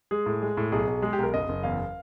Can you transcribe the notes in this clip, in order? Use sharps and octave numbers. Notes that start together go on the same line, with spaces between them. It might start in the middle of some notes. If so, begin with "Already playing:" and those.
G#3 G#4
A2
G#3
A2
B1 G#4
B1
G#3 G#4
G4
B1 A#4
F#1 D#5
F#1
E2 F5